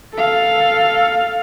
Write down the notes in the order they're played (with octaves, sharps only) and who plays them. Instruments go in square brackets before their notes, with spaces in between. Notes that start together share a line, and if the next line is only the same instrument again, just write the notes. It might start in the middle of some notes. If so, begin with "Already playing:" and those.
[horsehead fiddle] A4 F5